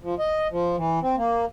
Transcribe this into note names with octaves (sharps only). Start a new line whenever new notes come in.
F3
D#5
F3
E3
C4
A#3